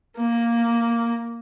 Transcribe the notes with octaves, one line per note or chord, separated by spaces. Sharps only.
A#3